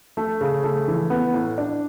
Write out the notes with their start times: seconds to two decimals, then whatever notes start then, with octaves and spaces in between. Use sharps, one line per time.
0.17 A3
0.41 C#3
0.64 A3
0.88 E3
1.10 B3
1.34 A2
1.58 D4